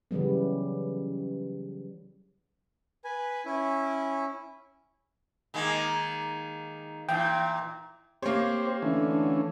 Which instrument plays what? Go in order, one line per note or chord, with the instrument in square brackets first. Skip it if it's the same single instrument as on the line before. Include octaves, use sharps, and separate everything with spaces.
[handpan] C#3 E3 F#3 G3 B3
[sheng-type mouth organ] B4 G#5
C#4 E4
[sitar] D#3 G#3 A#3
[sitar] A#2 E3 [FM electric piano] G5
[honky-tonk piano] A#3 C#5 [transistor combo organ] C4 G4 C5
[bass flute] D3 [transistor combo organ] E3 A3 C#4